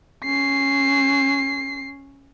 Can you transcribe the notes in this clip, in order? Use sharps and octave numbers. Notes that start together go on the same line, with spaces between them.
C#4 C7